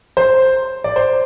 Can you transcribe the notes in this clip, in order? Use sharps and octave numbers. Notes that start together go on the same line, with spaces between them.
C5
D5
C5